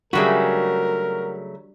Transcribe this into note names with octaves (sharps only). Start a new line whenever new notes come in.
C#3 F#3 G3 A3 D4 F#4 G#4 A#4